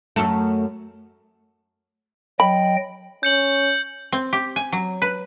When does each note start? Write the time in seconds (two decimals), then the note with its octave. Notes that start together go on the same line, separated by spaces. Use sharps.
0.16 F#2 A3
2.40 F#3 D#5 G5 B5
3.23 C#4 G6 C#7 F#7
4.12 C4
4.33 G4
4.56 G#5
4.72 F#3
5.02 B4